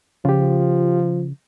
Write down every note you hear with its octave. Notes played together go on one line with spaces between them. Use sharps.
C#3 F3 F4 G4